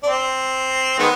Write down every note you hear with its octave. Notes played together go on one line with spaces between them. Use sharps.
D4
C4
D#3 G#3 B3